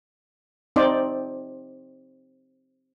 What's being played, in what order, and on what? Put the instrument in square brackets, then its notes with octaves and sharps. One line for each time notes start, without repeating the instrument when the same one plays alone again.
[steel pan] C4 D#4 C5 D5